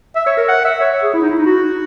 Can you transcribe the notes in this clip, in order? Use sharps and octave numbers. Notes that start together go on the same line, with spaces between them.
E5
C#5
A#4
F#5
E5
C#5
G#4
E4
D#4
E4
D#4
F#4